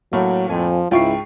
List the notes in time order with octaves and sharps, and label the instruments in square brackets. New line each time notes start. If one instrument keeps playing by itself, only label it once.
[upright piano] A2 A3 A#3 [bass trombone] F#3
[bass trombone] F2 [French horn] F3 [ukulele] G#5
[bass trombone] C#2 [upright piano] G#2 C#6 C7 [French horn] E4 [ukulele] F4 G5